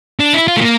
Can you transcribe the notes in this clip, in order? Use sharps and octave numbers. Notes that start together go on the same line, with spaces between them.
D4
E4
F4
A3
A#3